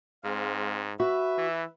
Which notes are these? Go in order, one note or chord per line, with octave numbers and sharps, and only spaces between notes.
G#2 G#3 C4 F5
F#4 B4 E5
E3